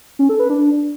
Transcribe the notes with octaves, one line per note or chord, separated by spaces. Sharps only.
C#4
A4
B4
D4